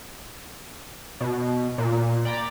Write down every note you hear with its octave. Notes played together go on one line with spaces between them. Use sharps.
B2
A#2
D5 G5 A#5 B5 D6 G#6